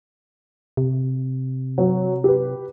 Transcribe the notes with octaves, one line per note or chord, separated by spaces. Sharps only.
C3
F#3
G4 B4